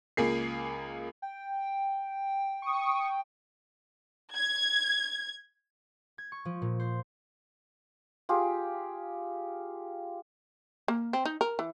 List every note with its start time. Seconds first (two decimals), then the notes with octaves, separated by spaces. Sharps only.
0.17 C#2 A#3 G#4 C7
1.22 G5
2.62 C#6 D#6
4.34 G#6
6.18 G#6
6.32 C#6
6.45 F3
6.62 A#2
6.80 C5
8.29 F4 G4 G#4
10.88 A#3
11.13 C4
11.25 D#4
11.41 A#4
11.59 E3